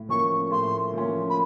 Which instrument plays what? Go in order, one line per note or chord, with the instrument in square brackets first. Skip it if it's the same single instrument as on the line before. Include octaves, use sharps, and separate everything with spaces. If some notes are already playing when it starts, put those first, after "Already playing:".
Already playing: [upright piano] A2
[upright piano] F3 A#3 C#4 [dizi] C#6
[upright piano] A2 [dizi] C6
[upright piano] F3 A#3 C#4
[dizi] B5